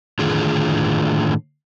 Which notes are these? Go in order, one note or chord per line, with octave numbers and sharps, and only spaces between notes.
A2 D3 D#3 F4 G#4